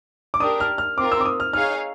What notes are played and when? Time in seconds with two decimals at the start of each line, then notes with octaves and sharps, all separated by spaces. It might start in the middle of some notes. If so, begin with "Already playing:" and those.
0.34 D6
0.40 D4 G4 A#4 D#6
0.60 F6
0.78 F6
0.98 C4 F4 A#4 D6
1.12 E6
1.21 D6
1.26 D#6
1.40 F6
1.53 D#4 G#4 C#5 F5 F6